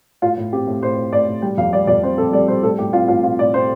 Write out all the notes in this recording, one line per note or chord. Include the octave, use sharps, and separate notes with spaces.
A2 F4
A2
C4 G4
A2
A2 C5
A2
A2 D5
A2
G3 G5
F2 F5
G3 D5
F2 D5
C4 C5
C4 A4
G3 D5
G3 C5
A2 A4
A2 G4
C4 F4
A2 F4
C4 F4
A2 D5
C4 C5